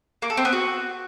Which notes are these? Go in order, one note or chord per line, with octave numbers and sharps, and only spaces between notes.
A#3
A4
C4
B3
F#4